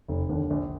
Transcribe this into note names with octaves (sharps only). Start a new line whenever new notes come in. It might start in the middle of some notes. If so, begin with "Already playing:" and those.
F1
D#2 D3
A#1